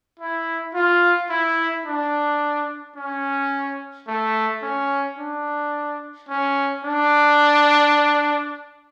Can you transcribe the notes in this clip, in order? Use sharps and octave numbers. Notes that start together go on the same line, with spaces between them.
E4
F4
E4
D4
C#4
A3
C#4
D4
C#4
D4